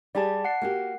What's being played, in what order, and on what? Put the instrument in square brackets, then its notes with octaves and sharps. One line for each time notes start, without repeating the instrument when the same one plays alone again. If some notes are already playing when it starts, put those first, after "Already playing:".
[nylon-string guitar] G3 G4 G#4 [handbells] D5 A5
[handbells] F#5 C7
[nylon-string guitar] A#3 F#4 G4